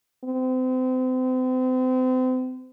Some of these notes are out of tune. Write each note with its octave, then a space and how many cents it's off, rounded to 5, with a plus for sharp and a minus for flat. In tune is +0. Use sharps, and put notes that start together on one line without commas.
C4 -35